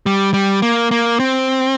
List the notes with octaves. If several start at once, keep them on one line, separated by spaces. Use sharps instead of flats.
G3
G3
A#3
A#3
C4